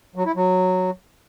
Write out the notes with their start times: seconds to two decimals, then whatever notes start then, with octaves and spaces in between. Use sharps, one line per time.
0.16 F#3
0.26 E4
0.36 F#3